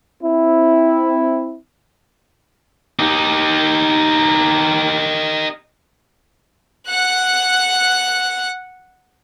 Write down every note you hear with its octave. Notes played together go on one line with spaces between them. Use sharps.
C4 E4
D#4 G4
F#5 F#6